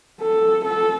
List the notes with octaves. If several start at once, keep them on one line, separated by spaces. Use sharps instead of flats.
A4
A4